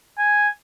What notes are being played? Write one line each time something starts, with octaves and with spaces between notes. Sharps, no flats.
G#5